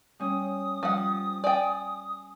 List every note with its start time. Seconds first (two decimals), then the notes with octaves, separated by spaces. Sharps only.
0.20 G3 C#4 D#6
0.83 F3 G3 F#5
1.44 D5 G5 G#5